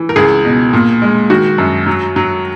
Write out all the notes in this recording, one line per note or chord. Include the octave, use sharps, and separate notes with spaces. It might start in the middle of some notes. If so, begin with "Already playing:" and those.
Already playing: E3
A#4
C#2 G#4
B2
A#2
G#3
D#3 F#4
F#2
F#3
F#3